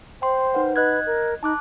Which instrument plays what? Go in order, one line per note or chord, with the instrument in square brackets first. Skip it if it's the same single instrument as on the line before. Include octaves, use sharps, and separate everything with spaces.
[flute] C5 [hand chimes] G5 C6
[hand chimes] D#4 B4 F#5
[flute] B4 [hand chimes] D#5 F#6 G#6
[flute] A#4
[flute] D#4 [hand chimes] A5 D6 F#6